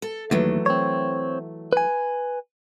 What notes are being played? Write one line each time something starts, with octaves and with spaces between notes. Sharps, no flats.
A4
D#2 E3 F#3 A3
C4 C#5
B4 G#5